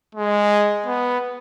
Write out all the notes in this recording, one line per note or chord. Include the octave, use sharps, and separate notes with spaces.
G#3
B3